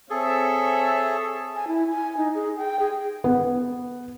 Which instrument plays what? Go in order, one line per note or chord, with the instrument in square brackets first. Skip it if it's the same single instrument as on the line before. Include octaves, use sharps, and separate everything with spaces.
[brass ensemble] C4 C#5 E5 [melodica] G#4 A4
[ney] G#5
E4
G#5
D#4
G#4
G5
G#4
[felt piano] B3